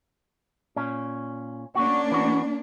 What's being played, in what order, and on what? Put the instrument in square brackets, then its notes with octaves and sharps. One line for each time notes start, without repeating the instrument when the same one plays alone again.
[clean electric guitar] A#2 C#4
[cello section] A#3 C#4 D4 [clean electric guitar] F#4
[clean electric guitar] E3 F#4